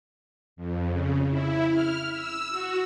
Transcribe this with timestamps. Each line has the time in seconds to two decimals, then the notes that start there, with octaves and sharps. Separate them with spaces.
0.56 F2
0.89 C#3
1.29 E4
1.70 F6
2.10 E6
2.50 F#4